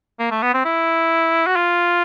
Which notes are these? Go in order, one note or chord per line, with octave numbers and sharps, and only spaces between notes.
A#3
A3
B3
C4
E4
F#4
F4